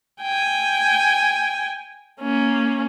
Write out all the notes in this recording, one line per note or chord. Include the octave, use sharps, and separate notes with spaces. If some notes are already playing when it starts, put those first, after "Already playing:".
G5 G#5
A#3 C#4